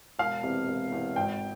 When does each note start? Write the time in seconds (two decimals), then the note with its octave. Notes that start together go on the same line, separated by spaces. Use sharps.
0.19 E1 F5
0.43 E2 C3
0.68 E1
0.92 E2 C3
1.16 G#1 G5